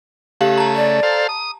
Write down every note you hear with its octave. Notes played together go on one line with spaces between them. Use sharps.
C#3 A3 G4 F5 F#7
A5 A#5
D5
A4 C5 F5
D#6